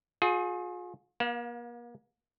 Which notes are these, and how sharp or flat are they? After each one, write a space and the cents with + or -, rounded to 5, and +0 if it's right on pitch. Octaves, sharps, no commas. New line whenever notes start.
F4 +40 G#4 +20 G5 +0
A#3 +40 F5 +20